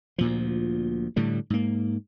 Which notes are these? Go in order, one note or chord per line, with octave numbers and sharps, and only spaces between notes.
D2 A#2 F3
A2 D3 G3
G#2 A#3